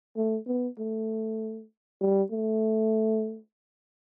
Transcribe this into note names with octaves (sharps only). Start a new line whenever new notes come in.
A3
B3
A3
G3
A3